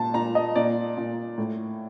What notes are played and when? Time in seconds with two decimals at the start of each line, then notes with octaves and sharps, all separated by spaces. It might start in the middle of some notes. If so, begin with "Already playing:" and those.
Already playing: A#2 A5
0.14 A#2 A#5
0.35 D#5
0.56 A#2 D5
0.97 A#2
1.38 A2